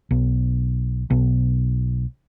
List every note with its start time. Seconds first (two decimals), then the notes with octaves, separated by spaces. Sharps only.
0.11 B1
1.10 B1